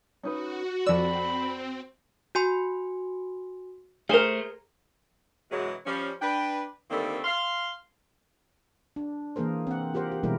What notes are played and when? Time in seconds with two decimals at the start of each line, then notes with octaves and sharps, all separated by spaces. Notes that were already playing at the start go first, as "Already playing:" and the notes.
0.23 C#4 D#4 F#4 B4
0.86 F2 C4 A4 D5 B5 E6
2.35 F#4 G#5 C6
4.09 A3 G#4 A#4 C5
5.51 F#2 B2 E3 F#3 G#3
5.86 F3 G3 C#4
6.22 D4 B4 G5
6.91 D3 D#3 G3 A3 A#3 C4
7.24 F5 C6
8.96 D4
9.36 E3 A#3 G#4 A#4 C5
9.67 C4 F#5
9.94 F4 G4 A#4 C5 F#5
10.12 G4
10.23 B2 E3 G3 G#3 E4 A#4